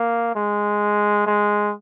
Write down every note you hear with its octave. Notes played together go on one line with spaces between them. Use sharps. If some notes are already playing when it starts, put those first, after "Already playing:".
Already playing: A#3
G#3
G#3